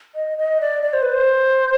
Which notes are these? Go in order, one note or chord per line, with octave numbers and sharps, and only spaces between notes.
D#5
D#5
D5
D5
C5
B4
C5